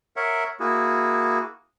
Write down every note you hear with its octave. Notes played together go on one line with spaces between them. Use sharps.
A#4 C#5 E5 F#5
A#3 E4 F#4 G#4